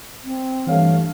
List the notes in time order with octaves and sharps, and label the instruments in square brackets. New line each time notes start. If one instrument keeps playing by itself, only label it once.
[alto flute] C4
[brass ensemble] G2 A3 F5 [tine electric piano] E3 C#5